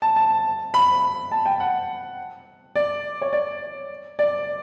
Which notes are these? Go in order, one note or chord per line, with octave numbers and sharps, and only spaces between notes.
A5
A5
B5
A5
G5
F#5
D5
C#5
D5
D5